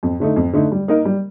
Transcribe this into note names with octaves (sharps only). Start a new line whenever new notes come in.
F2
D3 A3 D#4
F2
D3 A3 D#4
G3
A#3 D#4 A#4 D#5
G3